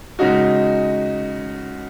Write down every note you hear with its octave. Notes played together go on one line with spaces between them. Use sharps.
C#3 G#3 D#4 F#4